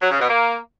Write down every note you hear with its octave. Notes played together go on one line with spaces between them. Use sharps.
F#3
C#3
B2
A#3